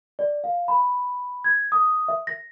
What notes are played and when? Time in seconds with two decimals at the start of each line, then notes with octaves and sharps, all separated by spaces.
0.19 D5
0.44 F5
0.68 B5
1.44 G#6
1.72 D#6
2.08 E5
2.27 A#6